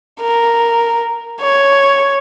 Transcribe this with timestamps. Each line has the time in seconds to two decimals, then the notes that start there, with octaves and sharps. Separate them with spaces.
0.21 A#4
1.41 C#5